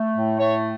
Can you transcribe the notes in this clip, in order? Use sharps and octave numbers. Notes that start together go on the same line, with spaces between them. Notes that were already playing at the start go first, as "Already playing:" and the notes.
Already playing: A3
A2
A3 C#5